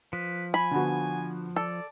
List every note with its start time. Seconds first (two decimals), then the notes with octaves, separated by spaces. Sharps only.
0.13 F3 B4
0.54 G#5 B5
0.71 D3 B3 F#4
1.56 A4 D5